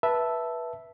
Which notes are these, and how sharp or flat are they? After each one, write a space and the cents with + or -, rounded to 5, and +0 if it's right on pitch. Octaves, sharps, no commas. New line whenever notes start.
B4 -15 E5 +0 A5 +0